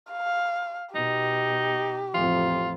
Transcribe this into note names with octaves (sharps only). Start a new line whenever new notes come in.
F5
B2 D#4 G4
A1 F2 F4